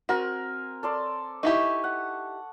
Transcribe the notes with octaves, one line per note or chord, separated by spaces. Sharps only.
C4 F#4 A#4 G#5
A4 D5 C6
D#4 E4 G4 C#6
F#5